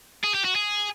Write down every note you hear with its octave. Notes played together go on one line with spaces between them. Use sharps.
G#4
G4
F#4
G#4